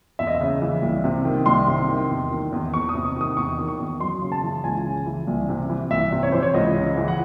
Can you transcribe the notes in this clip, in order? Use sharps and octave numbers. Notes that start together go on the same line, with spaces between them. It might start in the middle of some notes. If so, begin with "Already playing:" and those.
E2 E5
D#5
E5
C#3
E3
C2
C3
D#3
C2 C6
C3
D#3
E2
D#3
E2
E2 C#6
D#6
C3
C#6
D#3 D#6
E2 C#6
D#3
C#6
E2
F#2 C6
C#3
A5
E3
C#2 G#5
C#3
E3
C2
C3
E3
C2 E5
C3
C#5
E3 C5
C#5
C#2 D#5
C#3
E3
F#5